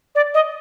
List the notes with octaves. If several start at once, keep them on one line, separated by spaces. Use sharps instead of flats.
D5
D#5